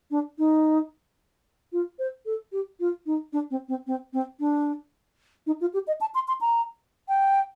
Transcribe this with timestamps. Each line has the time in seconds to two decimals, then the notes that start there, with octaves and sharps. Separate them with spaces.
0.11 D4
0.38 D#4
1.72 F4
1.99 C5
2.26 A4
2.52 G4
2.80 F4
3.06 D#4
3.33 D4
3.51 C4
3.68 C4
3.87 C4
4.13 C4
4.40 D4
5.47 D#4
5.61 F4
5.74 G4
5.87 D#5
6.01 A5
6.15 C6
6.28 C6
6.41 A#5
7.08 G5